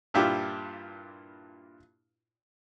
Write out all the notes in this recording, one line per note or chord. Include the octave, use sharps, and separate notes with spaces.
G2 A#2 D4 E4 F4 G4